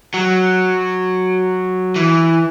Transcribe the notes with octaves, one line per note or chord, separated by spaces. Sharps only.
F#3
E3